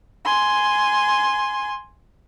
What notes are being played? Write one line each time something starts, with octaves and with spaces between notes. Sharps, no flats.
G#5 C6